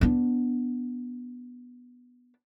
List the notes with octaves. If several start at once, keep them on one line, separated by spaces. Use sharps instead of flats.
B3 D4